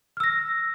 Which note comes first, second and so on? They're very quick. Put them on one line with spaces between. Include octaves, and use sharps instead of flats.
F6 E6 A#6